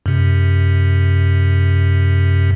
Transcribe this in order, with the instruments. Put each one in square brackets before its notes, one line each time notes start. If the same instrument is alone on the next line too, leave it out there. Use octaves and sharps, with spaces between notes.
[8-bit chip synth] F#2 C3